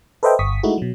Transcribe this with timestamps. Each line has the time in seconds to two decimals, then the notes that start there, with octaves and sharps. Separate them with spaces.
0.23 A4 B4 C5 D#5 E5 G5
0.39 G1 C#6 D#6 B6
0.63 G#3 A3 D#4 E4 F#4
0.78 B2 F#3